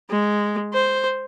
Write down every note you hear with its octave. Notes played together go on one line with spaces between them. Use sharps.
G#3
C5